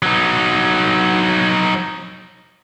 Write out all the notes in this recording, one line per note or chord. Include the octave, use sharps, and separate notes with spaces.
F#3 D#4